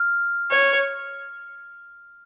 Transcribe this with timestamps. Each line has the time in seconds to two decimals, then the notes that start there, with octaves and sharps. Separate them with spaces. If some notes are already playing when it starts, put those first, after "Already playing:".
Already playing: F6
0.51 C#5